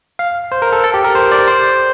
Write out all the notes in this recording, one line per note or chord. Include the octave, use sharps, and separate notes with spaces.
F5
C5
A#4
A4
A4
G4
A#4
C5
D5
C5